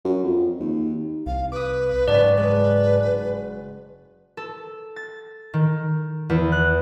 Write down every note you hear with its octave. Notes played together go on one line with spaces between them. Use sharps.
F#2
F2
D#2
C2 F5
B4 D6 D#6
F#1 G#2 D5 A5
G#3 B4
A4
A6
D#3
E2
F#6